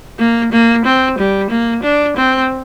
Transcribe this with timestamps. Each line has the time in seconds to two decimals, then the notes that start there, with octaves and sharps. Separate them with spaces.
0.19 A#3
0.52 A#3
0.85 C4
1.18 G3
1.50 A#3
1.83 D4
2.17 C4